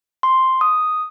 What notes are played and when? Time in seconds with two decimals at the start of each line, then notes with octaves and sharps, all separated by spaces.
0.23 C6
0.61 D#6